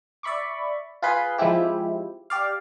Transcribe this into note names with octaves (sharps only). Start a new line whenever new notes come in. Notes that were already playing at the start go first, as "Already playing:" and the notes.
D5 E5 B5 C#6 D6
F4 G#4 B4 C6
F3 G#3 C4 E4 G4
G4 D5 F5